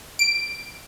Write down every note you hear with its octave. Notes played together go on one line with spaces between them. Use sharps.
D7